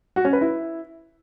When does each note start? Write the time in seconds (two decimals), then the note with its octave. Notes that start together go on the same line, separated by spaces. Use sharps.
0.16 F#4
0.25 C#4
0.33 B4
0.41 E4